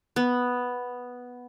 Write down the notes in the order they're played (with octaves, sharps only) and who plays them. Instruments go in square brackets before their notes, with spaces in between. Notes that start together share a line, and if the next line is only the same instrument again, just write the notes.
[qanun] B3